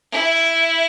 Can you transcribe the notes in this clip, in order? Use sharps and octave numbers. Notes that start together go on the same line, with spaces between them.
E4